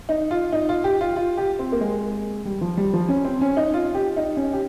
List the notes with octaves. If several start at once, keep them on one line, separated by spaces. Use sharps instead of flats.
D#4
F4
D#4
F4
G4
F4
F4
G4
C4
A#3
G#3
G3
F3
G3
F3
C#4
C4
C#4
D#4
F4
G4
D#4
C#4
G4